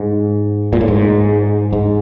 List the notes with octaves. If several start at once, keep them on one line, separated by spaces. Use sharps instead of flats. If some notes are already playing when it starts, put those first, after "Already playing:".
Already playing: G#2
A#2
A2
G#2
G#2